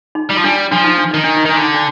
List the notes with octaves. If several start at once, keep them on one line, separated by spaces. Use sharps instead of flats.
D#4
G3
F3
G3 D4
F3 D4
D#4
D4
D#3 D#4
D4
D#4
D#3 D4
D3
D#4
D4